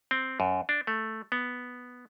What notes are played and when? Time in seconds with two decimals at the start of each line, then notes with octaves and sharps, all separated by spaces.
0.11 C4
0.40 F#2
0.69 D4
0.87 A3
1.32 B3